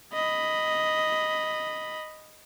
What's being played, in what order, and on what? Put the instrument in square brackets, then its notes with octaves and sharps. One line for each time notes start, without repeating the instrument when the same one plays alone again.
[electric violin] D#5 B5